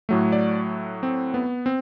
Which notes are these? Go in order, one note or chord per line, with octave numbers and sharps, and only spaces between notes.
A2 F#3 A3
D5
C4
B3
C4